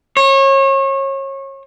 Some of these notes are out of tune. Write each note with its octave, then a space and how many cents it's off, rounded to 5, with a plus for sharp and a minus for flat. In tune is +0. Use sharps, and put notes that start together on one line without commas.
C#5 -30